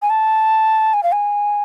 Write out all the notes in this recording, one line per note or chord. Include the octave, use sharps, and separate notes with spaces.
G#5
A5
G#5
F5
G#5